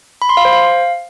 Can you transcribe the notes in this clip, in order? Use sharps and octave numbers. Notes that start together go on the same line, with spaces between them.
B5
C6
F5
C5
F5